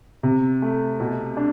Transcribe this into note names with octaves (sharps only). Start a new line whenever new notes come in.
C3
A3
B2
D4